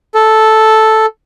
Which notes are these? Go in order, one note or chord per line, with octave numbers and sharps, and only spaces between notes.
A4